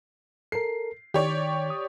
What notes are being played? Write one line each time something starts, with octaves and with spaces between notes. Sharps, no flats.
A4 A#4 C7
D#3 G4 C#5 D5
D#6